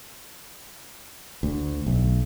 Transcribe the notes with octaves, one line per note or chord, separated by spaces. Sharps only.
D2
B1